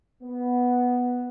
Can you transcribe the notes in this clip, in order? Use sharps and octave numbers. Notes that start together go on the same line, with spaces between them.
B3